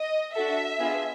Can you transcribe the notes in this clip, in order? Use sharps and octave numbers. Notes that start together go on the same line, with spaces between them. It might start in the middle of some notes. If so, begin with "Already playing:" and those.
Already playing: D#5
D4 F#4 A4 E5
B3 D4 F4 G#4